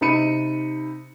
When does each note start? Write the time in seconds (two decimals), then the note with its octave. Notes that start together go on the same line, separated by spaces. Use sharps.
0.01 C3 D#4 B5 C#7 D#7